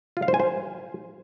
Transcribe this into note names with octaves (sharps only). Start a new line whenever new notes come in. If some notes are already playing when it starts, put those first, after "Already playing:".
F4
F5
C5
G#5
C5